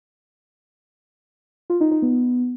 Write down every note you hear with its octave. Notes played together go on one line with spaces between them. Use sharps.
F4
D#4
D#4
B3